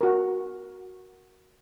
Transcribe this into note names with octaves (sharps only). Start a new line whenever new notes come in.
F#4 A#4